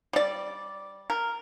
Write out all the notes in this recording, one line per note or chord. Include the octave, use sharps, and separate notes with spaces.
G3 D5
A#4